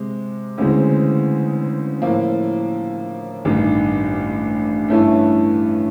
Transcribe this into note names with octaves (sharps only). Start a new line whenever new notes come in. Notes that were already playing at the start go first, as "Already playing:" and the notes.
Already playing: C3 G#3
D2 C#3 E3 G#3 C4
A2 F3 A#3
A1 G2 D#3
G2 E3 A3 C#4 E4